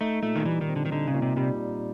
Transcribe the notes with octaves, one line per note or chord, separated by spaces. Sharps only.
A3 D#4
A#2 A3
D#3
E3 G3
D#3
C4
D3
D#3
D3 D#4
C#3
A#2
C3
C3 G3